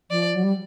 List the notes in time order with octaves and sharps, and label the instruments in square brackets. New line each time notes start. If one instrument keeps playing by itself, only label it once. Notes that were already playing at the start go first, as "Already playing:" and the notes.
[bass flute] F3 [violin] D5
[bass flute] F#3
G3